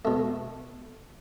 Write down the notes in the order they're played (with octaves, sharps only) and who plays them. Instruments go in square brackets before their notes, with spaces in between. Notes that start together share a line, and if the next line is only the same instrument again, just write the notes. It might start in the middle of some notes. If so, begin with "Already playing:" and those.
[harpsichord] B2 A3